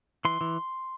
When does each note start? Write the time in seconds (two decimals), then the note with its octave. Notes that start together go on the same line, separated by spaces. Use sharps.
0.25 E3 C6
0.41 E3